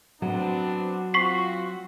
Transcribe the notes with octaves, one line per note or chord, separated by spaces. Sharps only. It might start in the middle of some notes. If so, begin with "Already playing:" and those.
F#3 B3 C4 D4
C4 F4 F#4 C#6 B6 C7